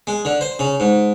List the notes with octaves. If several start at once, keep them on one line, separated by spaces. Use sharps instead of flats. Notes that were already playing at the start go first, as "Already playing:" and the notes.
G#3
D3
C5
C#3
G#2